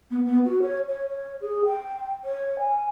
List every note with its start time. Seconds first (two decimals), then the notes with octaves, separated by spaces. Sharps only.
0.11 B3
0.25 B3
0.45 F#4
0.62 C#5
0.89 C#5
1.09 C#5
1.41 G#4
1.65 G5
2.25 C#5
2.59 G#5